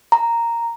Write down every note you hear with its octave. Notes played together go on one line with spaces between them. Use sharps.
A#5